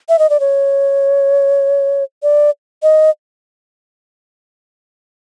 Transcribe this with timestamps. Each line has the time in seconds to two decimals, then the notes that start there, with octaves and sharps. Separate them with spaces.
0.09 E5
0.19 D#5
0.30 D5
0.40 C#5
2.23 D5
2.83 D#5